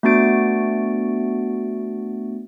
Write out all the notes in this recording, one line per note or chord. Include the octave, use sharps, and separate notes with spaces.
A3 B3 D4 F#4 A6 D7